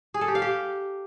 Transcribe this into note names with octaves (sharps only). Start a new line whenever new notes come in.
G#4
A4
G4
F5
G4